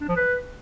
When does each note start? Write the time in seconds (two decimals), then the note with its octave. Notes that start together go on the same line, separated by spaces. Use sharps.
0.01 D4
0.08 F3
0.16 B4